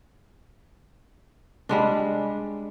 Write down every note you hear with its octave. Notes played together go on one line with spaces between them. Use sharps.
G3 G#3 D4